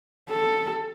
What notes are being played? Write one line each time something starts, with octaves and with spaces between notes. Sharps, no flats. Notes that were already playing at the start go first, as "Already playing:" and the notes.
A4